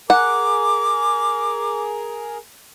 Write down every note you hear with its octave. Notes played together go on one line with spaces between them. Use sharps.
G#4 A#4 F#5 D6